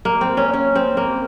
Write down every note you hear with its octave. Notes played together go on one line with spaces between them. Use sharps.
A#3
C4
C#4
C#4
C4
A#3